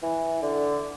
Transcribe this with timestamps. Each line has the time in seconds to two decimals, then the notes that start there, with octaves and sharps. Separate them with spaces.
0.03 E3
0.42 D3